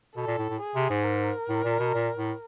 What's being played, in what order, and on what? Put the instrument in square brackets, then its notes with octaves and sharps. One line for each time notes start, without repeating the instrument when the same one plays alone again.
[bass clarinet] B2 [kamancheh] A4
[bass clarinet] A#2
A2
A2
[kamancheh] G#4
[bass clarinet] C3
G#2
[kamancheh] A#4
[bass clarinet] A2
A#2
B2
A#2
A2